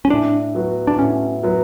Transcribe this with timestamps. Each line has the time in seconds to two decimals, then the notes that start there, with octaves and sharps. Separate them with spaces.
0.05 C#4
0.10 A2 D4
0.55 F#3 B3 F#4
0.87 D4
0.99 A2 C#4
1.43 F#3 B3 F#4